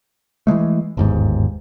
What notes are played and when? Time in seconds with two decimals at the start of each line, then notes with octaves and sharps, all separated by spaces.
0.47 E3 F#3 G#3 A3
0.97 G1 D#2 G#2